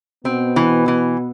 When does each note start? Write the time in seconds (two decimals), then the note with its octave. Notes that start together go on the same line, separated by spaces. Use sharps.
0.25 B2 B3 C4
0.56 E3
0.88 E3